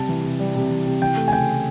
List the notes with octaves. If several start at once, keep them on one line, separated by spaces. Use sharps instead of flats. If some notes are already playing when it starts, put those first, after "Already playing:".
Already playing: C3 G3 A5
E3
C3
G3
C3
E3
C3
E3 G5
A3
G#5
C#3 G5